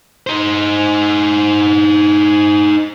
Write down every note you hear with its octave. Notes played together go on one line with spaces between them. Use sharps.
D#4 C5